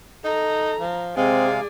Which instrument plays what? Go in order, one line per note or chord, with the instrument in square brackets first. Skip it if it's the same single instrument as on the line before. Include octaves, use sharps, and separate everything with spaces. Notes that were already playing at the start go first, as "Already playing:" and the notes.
[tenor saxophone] D#4 [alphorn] A4 [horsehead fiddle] A#5
[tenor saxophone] F3
[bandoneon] C3 F5 [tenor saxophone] G#3 [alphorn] C4 [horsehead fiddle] G#4 D5